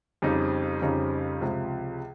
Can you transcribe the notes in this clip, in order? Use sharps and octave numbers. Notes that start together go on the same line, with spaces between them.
F2 C#3 G3 C4 D#4
F2 C#3 G3 C4 D#4
C#2 C3 F3